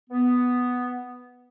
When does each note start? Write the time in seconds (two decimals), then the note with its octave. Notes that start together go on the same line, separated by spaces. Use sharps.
0.10 B3